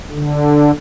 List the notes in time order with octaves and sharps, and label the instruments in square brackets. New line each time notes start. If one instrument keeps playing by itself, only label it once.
[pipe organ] D3